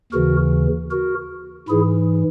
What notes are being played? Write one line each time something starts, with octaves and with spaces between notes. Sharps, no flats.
D#2 C#3 E3 F#4 A#4
F#4 A#4
G#2 E3 E4 G#4